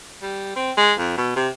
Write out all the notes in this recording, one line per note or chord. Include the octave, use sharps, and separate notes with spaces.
G3
C4
G#3
F2
B2
C3